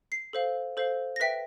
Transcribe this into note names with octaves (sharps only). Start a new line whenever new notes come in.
C7
A4 C5 F5
A4 C5 F5
A#6
B4 E5 G5 B6